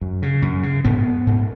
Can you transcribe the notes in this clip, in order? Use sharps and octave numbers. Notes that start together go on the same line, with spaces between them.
F#2
C#3
F#2
C#3
G#2 B3
G#2